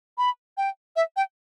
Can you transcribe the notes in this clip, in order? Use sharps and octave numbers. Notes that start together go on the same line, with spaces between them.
B5
G5
E5
G5